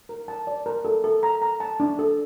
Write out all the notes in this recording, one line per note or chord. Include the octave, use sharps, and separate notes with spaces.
A#4
A5
D5
A#4
A4
A4
A#5
A#5
A5
D4
A4